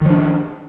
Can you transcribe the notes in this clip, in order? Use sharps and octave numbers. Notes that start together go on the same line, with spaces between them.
D#3 F3 D4